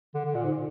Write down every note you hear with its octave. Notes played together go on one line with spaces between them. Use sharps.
D3
D3
A#2
G#2